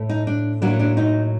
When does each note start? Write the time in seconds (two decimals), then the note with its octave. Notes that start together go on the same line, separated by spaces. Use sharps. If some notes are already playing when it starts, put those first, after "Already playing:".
Already playing: A2 A3
0.09 D#4
0.27 D4
0.62 A2 F#3 A#3 D4
0.79 D4
0.97 D#4